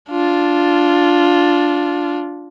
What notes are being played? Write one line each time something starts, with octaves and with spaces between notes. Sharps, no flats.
D4 F4